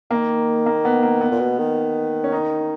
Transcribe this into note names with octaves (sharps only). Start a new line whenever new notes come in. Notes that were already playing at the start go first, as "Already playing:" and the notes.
D#3 A#3
A#3
B3
A#3
B3
A#2
B2
D#3
C#4
D#4